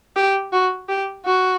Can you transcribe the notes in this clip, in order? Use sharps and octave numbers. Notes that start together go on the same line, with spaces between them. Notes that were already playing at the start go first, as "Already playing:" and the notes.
G4
F#4
G4
F#4